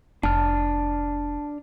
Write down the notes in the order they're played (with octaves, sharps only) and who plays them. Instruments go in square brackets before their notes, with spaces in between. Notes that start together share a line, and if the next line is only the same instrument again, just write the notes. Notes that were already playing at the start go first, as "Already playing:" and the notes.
[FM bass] F1 [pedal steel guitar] D4 F6 [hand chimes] A5